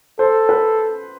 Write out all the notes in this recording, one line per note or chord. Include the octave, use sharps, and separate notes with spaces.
A4 C5
B4